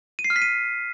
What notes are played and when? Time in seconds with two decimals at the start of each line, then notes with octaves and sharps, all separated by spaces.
0.19 D#7
0.24 C7
0.30 F6
0.36 B6
0.42 D#7